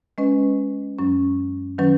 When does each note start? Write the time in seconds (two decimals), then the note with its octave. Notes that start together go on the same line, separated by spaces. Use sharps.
0.18 G#3 C#4 B4 D#5
0.98 F#2 F#3 C#4
1.78 D#3 F#3 C#4 B4